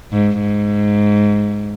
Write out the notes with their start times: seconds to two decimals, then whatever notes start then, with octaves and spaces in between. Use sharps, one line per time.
0.12 G#2
0.41 G#2